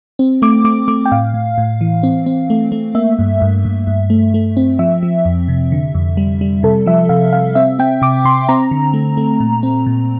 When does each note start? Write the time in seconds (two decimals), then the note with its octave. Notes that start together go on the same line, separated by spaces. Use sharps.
0.19 C4
0.42 A3 D6
0.64 A3 D6
0.88 A3 D6
1.05 G5
1.12 A2 F5
1.34 A2
1.58 A2
1.81 E3
2.03 C4
2.26 C4
2.50 A3
2.72 A3
2.95 A#3 E5
3.19 G2
3.42 G2
3.65 G2
3.87 G2
4.10 A3
4.34 A3
4.57 C4
4.79 F3 E5
5.03 F3
5.25 F2
5.48 C3
5.72 D3
5.95 F2
6.17 G3
6.41 G3
6.63 C3 A4
6.86 F3 E5
7.09 C3 F5
7.33 C3 F5
7.55 C4 E5
7.79 C4 G5
8.02 C3 D6
8.25 C3 C6
8.49 C4 A#5
8.71 D3
8.94 A3
9.17 A3
9.40 A#2
9.63 C4
9.86 A#2